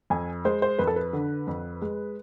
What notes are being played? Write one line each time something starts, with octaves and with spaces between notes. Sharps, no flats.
F2 G#5
G#3 C5
C5
F2 B4
A4
B4
D3
F2
G#3